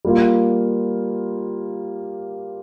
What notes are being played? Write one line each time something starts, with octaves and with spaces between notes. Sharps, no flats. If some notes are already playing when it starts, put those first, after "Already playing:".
G3 A#3 F4